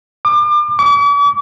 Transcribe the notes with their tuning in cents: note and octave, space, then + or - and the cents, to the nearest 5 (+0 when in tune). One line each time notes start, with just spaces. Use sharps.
D6 +35
D6 -45